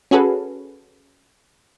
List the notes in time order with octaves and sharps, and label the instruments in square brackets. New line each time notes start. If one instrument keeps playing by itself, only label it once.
[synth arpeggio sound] C#4 F#4 G#4 A4 B4